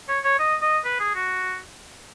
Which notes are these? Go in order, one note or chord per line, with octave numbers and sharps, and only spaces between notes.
C#5
C#5
D#5
D#5
B4
G#4
F#4